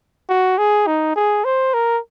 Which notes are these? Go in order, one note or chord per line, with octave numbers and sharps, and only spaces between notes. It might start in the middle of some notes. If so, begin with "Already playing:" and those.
F#4
G#4
D#4
G#4
C5
A#4